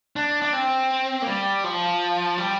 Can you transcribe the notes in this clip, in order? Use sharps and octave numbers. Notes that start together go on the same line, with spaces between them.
D4
D4
C4
A#3
G3
F3
G3